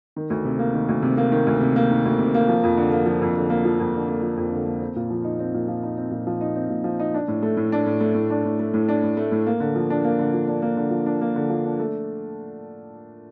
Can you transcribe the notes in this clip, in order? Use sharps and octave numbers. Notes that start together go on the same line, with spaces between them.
D#3
D2
C3
A#3
D#3
D2
C3
A#3
D#3
D2
C3
A#3
D#3
D2
C3
A#3
F3
F2
D3
A#3
F3
F2
D3
A#3
F3
F2
D3
A#3
F3
F2
D3
A#3
C4
A#2
F3
D#4
C4
A#2
F3
D#4
C4
A#2
F3
D#4
C4
A#2
F3
D#4
D4
A2
A3
A2
D4
A2
A3
A2
D4
A2
A3
A2
D4
A2
A3
A2
A#3
D3
F3
D4
A#3
D3
F3
D4
A#3
D3
F3
D4
A#3
D3
F3
D4
A3